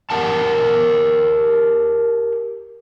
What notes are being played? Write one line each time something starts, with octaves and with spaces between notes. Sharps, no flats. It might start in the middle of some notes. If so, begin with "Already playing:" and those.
G4 A#4 F#5 A5